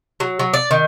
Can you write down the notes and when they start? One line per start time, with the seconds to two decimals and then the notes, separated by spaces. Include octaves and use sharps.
0.20 F#3
0.39 F#3
0.54 D5
0.71 D#3